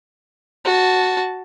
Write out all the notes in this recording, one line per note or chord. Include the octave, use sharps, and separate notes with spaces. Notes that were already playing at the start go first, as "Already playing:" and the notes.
F#4 A5